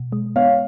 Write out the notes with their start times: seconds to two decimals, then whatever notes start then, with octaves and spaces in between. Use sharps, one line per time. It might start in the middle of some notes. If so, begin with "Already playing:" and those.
Already playing: B2
0.12 G#3
0.36 B3 C#5 F5